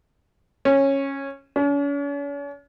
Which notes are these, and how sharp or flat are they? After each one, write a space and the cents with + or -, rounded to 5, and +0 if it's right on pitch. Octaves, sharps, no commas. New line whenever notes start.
C#4 -15
C#4 +40